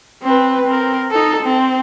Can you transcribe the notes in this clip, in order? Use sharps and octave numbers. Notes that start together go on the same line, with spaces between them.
C4 B4
C4 A#4
D#4 A4
C4